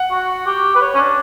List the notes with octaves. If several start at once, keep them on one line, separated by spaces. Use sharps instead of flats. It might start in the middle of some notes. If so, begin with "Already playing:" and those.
Already playing: F#5
F#4
G4
B4
C#5
C#4
D4